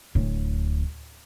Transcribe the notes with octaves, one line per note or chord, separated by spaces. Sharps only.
D1